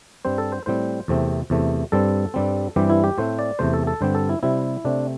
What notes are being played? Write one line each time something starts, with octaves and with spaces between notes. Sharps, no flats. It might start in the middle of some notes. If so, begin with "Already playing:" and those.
G2 G3 C4 C5
A4
C5
A2 G3 C4 C5
E2 C3 A3 C4
E2 C3 A3
G2 G3 C4 A4
G2 G3 C4
G2 E3 G3 C4 G4
E4
G4
A2 A3 C4 C5
D5
E2 C3 A3 C5
A4
A4
G2 D3 G3 C4 C5
A4
E4
C3 G3 C4 E4
C3 A3 C4 D4